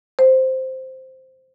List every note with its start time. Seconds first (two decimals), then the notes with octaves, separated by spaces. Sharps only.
0.19 C5